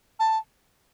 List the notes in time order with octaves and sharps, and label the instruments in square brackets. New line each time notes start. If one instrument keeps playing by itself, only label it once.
[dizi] A5